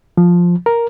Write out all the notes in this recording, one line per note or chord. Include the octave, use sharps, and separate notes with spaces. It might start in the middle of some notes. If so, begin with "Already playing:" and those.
F3
A#4